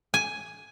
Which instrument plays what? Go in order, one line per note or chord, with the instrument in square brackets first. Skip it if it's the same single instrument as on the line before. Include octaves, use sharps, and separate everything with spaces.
[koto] G#5